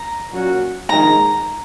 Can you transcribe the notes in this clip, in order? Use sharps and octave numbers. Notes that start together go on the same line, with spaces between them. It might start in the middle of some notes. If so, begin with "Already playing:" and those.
Already playing: A#5
A#2 F#3 C#4 F#4
A#1 G#2 D#3 G#3 D#4 A#5